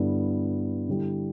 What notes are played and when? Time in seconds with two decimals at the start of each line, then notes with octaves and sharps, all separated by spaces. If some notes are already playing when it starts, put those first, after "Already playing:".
Already playing: G2 D3 B3 E4
0.88 D3 G3 E4